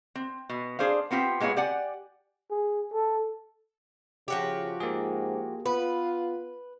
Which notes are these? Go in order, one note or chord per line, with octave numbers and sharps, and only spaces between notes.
C4
B2
D4 G#4 C5 D5 F5
B3 C4 F4 G4
A#2 G#3 B3 F4 C#5
G4 D5 F#5 G#5
G#4
A4
C#3 F3 F#4 G4
G#2 A#3 G#4
B3 F4 B4